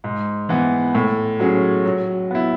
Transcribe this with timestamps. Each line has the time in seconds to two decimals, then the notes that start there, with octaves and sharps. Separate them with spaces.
0.04 G#2
0.49 E3 B3
0.95 A2
1.40 F#3 C#4 G#4
1.85 F#3
2.31 B3 E4